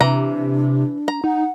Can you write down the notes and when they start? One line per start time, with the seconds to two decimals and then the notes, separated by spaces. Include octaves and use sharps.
0.01 C3 E3 D4 A#5
1.08 A#5
1.24 D#4 F#5